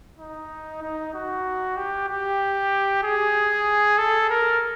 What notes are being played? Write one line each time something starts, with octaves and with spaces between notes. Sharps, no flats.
D#4
D#4
F#4
G4
G4
G#4
A4
A#4